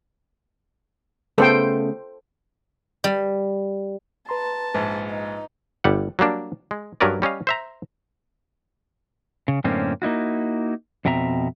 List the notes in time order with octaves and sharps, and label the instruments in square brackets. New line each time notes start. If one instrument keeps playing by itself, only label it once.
[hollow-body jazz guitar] C#3 A3 B3 [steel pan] A4 C5 G5
[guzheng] G3
[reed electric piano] B4 A#5 C6 [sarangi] A5
[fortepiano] A#1 G#2
[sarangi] D#4
[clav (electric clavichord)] G1 G3 F#5
F#3 G3 A#3 D4
G#3
G2 F#3 C#4 A#4 B4 D5
G3 C#4 D#5 F5
C5 E5 A#5
[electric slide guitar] C#3
F#2 A2 D3 A#3 C4 C#4
A#3 D#4 E4 F#4
F2 B2 C4 E5 A#5